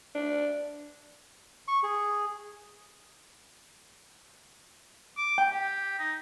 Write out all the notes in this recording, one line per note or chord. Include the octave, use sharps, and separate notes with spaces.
D4
C#6
G#4
D6
G5
G4
D#4